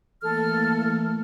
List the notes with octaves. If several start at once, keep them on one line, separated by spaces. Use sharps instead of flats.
E3 A3 A#3 A4 F6